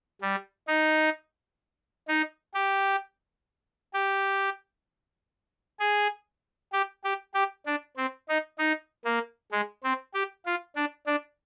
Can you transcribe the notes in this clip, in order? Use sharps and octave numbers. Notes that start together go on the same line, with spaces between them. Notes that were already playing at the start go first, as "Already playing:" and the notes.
G3
D#4
D#4
G4
G4
G#4
G4
G4
G4
D4
C4
D#4
D#4
A#3
G#3
C4
G4
F4
D4
D4